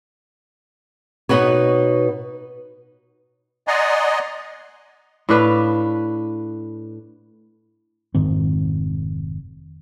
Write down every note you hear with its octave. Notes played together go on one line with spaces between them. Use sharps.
B2 D#4 F#4 B4 C#5
D5 D#5 F#5 G#5 A#5 C6
A2 D4 B4 F5
F1 G#2 D#3 C4